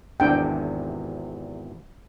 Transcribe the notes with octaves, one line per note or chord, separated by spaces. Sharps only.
G#1 E2 C3 D4 G5